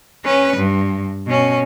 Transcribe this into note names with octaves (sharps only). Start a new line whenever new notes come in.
C#4 B4
G2
B2 C#4